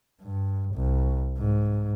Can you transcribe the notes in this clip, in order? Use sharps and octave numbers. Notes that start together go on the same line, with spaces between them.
G2
C2
G#2